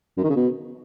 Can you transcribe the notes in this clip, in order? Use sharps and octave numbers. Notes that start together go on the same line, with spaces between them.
F#2
D#3
C#3
B2